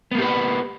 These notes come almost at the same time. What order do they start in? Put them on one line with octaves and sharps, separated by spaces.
B3 A#3 G4 B4